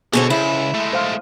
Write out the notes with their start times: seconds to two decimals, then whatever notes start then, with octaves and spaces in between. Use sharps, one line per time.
0.13 B2 D3 F#4 G#4 A4 C5 C#5
0.30 C#2 E4
0.75 G#3 A3
0.93 C5 F5 C6